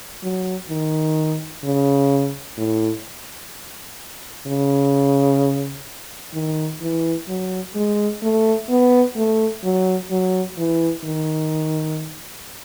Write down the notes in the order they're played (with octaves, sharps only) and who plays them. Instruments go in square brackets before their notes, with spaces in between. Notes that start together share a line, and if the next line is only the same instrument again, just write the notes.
[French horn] F#3
D#3
C#3
A2
C#3
D#3
E3
F#3
G#3
A3
B3
A3
F#3
F#3
E3
D#3